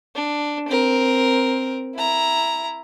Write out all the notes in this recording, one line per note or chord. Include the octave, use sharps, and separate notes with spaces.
D4
C4 A#4
E4 A#5